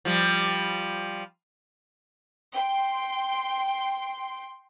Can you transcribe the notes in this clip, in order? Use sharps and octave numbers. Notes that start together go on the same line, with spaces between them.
F3 G3
G5 C6